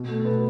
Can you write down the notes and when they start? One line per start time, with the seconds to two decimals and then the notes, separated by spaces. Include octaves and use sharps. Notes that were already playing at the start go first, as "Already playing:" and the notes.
Already playing: B2
0.08 A3
0.20 A4
0.24 B2 B3 B4